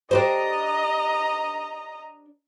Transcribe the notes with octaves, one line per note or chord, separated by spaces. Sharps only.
D4 G4 C5 D#5 A#5